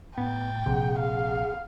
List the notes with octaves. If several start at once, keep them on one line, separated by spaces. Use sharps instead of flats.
A2 B3 G5 G#6 A6
A#1 C3 G#4 F#5
F5